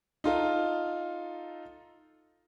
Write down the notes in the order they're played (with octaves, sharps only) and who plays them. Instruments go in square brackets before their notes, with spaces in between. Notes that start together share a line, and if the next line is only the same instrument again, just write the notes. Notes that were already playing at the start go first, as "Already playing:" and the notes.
[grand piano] D#4 F4 A4